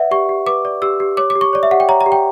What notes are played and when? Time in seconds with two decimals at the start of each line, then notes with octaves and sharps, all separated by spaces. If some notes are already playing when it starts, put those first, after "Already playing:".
Already playing: B4 D5 E5 F#5
0.11 G4 C#6
0.29 G4
0.47 B4 D6
0.65 D5
0.82 G4 E6
1.00 G4
1.17 C#5 D6
1.30 D6
1.35 G4
1.41 C#6
1.53 C#5 D5
1.63 E5
1.71 G4 F#5
1.80 G5
1.89 C#5 A#5
2.01 A#5
2.06 G4
2.12 G5